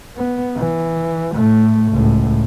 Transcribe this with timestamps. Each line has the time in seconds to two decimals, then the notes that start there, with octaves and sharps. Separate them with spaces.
0.17 B3
0.56 E3
1.32 A2 A3
1.92 C#2 A2